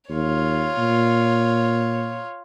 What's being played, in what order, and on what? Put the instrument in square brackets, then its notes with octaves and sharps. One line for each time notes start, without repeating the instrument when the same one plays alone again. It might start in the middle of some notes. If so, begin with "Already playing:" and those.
[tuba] D#2 [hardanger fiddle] F4 C#5
[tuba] A#2